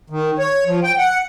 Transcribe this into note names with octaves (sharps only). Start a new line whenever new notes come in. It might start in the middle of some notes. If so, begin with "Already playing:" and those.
D#3
C#5
F3
G5
F#5